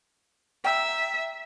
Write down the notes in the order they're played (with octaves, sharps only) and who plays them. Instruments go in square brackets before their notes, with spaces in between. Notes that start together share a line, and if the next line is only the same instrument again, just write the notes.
[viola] E5 [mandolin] G5 A#5 E6